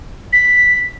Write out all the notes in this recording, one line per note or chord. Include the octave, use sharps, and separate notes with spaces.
B6